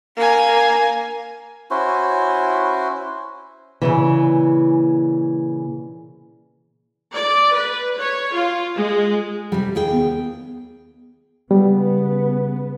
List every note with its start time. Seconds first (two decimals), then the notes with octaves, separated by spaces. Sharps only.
0.17 A#3 G#5
1.71 C#4 E4 F#4 C5
3.82 A#2 C#3 E3
7.15 D5
7.54 B4
7.97 C#5
8.33 F4
8.76 G#3
9.52 C3 G3
9.75 D#2 G#4 G5
9.91 B3
11.51 C#3 G3 B3